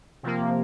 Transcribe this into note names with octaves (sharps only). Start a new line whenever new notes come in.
C3 F3 A#3